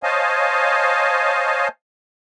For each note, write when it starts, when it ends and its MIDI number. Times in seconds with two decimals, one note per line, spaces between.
0.03 1.68 72
0.03 1.68 73
0.03 1.68 75
0.03 1.68 77
0.03 1.68 80
0.03 1.68 81